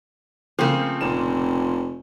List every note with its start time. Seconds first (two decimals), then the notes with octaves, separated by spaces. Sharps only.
0.59 C#3 F3 A3 A#3 C4
1.01 F1 A#2 E7